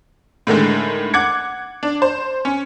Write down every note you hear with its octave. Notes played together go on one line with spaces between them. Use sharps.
A2 D3 D#3 G#3
F#5 D6 G#6 C#7
D4
C5
C#4